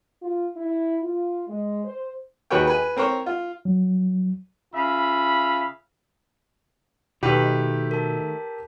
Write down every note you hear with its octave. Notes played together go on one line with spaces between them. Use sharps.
F4
E4
F4
G#3
C5
D#2 F#4 G#4 B4 C#5 G5
B4 G#5
C4 A#4 C5 C#5
F4
F#3
C#3 F4 E5 F5 B5
B2 D#3 A3 G4 B4
A#4 A5